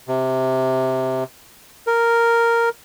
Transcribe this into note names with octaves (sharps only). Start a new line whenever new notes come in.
C3
A#4